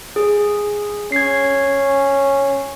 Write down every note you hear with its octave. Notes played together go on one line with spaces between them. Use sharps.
G#4
C#4 G#6 C7